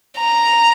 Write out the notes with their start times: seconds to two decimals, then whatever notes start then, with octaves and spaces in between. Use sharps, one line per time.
0.19 A#5